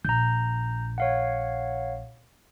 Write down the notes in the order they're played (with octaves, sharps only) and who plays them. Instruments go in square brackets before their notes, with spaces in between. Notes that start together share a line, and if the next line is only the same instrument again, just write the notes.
[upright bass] A#1 [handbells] A#5 G6
[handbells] C#5 F5 F#5